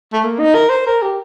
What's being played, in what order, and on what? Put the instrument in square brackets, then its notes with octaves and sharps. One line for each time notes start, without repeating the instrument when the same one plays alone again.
[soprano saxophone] A3
A#3
D#4
A#4
C5
A#4
G4